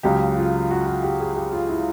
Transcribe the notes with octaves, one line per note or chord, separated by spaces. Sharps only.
C#2 C#3 F#3 G4
F4
F#4
F#4
G4
G#4
G4
F4
E4